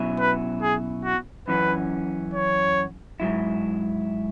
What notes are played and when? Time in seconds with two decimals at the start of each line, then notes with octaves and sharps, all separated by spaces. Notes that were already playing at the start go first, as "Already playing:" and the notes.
Already playing: B2 F#3 C#4 E4
0.19 B4
0.62 G#4
1.04 F#4
1.48 F#2 E3 C#4 B4
2.34 C#5
3.20 G#2 F#3 E4